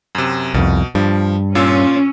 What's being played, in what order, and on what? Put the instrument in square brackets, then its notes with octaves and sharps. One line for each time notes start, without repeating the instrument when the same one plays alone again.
[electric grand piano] F#2 C3
[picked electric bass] C2 F2 [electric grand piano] B2
[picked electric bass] G2 [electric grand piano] F3
[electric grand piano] A#2 F4 E6 [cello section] C#4